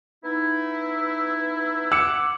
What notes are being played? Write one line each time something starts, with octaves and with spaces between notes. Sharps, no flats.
B3 D#4 E4
F#5 D6 E6 C#7